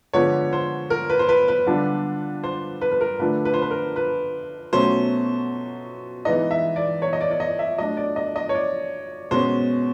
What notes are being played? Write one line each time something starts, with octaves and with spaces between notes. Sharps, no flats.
D3 F3 G#3 B3 C#5
C5
A#4
B4
C5
B4
B4
D3 G3 B3 D4 F4
C5
B4
B4
A#4
D3 F3 A3 D4 B4
B4
C5
B4
A#4
B4
B2 F#3 A3 C#4 C5
E3 G#3 B3 D#4 D#5
E5
D5
C#5
D#5
D5
D5
D#5
E5
F#3 A3 D4 D#5
D5
D#5
D#5
C#5
D5
B2 G#3 C#4 C5